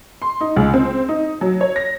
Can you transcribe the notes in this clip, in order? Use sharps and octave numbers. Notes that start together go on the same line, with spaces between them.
C6
D#4
C#2
C4
D#4
F#3
C#5
A#6